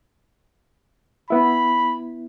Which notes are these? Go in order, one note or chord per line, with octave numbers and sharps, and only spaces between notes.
B3 E4 B5